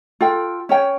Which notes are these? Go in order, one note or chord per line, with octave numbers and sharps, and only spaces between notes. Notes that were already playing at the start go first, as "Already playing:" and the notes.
F4 A4 G5
C#4 C#5 G5